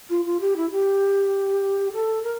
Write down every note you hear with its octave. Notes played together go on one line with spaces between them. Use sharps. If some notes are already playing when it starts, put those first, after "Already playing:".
F4
F4
G4
E4
G4
A4
A#4